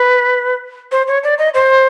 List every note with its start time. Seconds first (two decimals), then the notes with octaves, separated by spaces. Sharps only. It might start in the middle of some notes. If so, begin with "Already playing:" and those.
Already playing: B4
0.91 C5
1.07 C#5
1.24 D5
1.38 D#5
1.54 C5